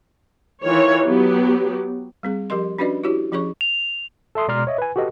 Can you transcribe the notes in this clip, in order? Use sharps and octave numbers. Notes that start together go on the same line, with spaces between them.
D#3 E3 F4 C#5
F#3 B3 G4
G3 C4 G#4
F3 G4 A#4 D#5 C6
C#4 D4 F#4 B4 D5 D#5
E4 F#4 G4 C#5
F3 C#4 G#4 C#5 C#6
F7
A4 E5 C6 D#6
B2 G#3 D5 A#5 C6 F6
C#5 D#5 E5
B4 G#5
F#4 G4 A4 B4 D#5